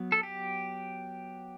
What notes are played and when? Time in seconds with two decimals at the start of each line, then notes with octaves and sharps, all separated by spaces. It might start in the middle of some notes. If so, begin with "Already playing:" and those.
Already playing: F#3 B3
0.12 A4
0.23 G4